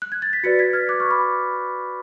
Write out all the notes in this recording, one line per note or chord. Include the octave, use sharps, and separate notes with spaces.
F#6
G#6
A6
B6
F#4 B4 D5 A6 C#7
G#6 B6
F6 G#6
D6 F#6
C#6 F6
B5 D6